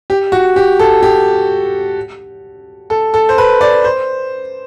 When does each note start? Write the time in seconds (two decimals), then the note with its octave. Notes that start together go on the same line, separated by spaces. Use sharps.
0.10 G4
0.32 F#4
0.56 G4
0.79 A4
1.03 G4
2.90 A4
3.14 A4
3.29 C5
3.38 B4
3.61 D5
3.84 C5